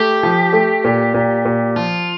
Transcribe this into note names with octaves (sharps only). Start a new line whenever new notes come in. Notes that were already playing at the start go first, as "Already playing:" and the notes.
Already playing: A3 G4
F3
A3
A#2
A#2
A#2
F3 F4